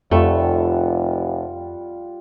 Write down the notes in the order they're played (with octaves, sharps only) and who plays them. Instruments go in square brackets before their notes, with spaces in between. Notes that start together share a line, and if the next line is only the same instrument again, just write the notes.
[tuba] F1 [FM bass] F2 [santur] G3 F4 F#5 [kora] A3